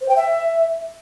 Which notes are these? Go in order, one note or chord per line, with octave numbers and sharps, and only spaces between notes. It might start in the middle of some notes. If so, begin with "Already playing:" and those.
C5
G5
E5